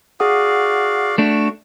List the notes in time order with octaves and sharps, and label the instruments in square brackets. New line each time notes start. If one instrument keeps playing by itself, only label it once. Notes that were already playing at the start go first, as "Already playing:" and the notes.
[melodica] F#4 D5 F5 [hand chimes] G#4 F#5 D#6
[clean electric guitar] A3 D4 [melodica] F#4 C#6